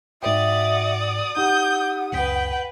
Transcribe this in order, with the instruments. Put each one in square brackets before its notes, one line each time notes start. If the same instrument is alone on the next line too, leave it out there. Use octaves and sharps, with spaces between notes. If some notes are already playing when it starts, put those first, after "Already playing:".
[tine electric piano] G#2 G5 [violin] F#4 D5 [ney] E5 [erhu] D#6
[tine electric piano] D#4 G4 [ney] F#5 [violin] G6
[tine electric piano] C#2 F#2 B6 [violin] B4 G5